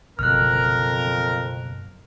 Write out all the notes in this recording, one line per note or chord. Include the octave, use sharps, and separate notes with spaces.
F#1 F2 B2 D3 A#4 F6 F#6